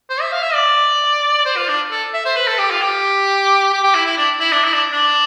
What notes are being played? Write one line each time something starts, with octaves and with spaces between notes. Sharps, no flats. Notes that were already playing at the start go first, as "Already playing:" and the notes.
C5
E5
F5
E5
D5
C5
F4
D4
A4
E5
C5
B4
A4
G4
F4
G4
G4
G4
E4
E4
D4
E4
D4
E4
D4
D4